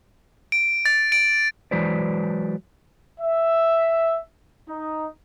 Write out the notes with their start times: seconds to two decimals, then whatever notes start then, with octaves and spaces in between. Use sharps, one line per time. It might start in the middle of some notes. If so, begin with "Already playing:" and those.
0.52 D7
0.86 A6
1.12 D7
1.71 E3 F#3 G#3 B4 C5 D5
3.19 E5
4.68 D#4